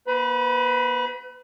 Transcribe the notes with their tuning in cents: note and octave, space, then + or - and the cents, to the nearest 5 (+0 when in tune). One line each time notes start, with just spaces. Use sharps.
A#3 +40 B4 +35 B5 -30